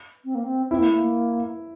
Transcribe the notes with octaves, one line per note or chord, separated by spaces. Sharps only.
C4
A#3
C4
C4 E4
A#3
A3
A#3